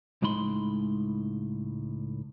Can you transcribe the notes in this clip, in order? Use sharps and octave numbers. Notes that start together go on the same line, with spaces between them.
C#2 A2 G#3 D#4 B5 C6